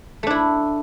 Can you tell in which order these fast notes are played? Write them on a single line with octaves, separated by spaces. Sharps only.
A3 D4 E4